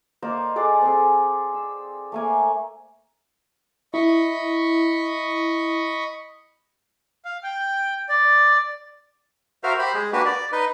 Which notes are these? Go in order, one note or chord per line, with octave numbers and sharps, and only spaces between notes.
A#3 C5 D5 D#5
G#4 A4 D5 F#5
C4 G#4
E6
A3 A#3 G#5
E4 D#5 B5 C#6
F5
G5
D5
F#4 A#4 C5 E5 F5
G4 C5 B5
G#3 G#4
A#3 D4 F#4 G4 B4
D5
D#4 B4 D#5